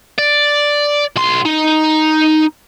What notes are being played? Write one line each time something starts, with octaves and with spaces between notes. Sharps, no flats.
D5
B1 C6
D#4